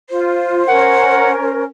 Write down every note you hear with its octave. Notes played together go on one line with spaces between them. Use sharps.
F4 C5
C#4 A#4 F#5